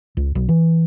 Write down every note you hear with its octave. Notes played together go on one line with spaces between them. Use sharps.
C#2
B1
E3